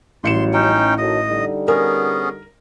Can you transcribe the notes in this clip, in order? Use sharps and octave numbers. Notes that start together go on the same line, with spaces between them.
A1 D#2 F#3 G3 C6 C#7 E7
C#4 D#4 G5
D#3 F#3 A4 D#5
D3 G3 D#4
B3 C#4 G#4 A#4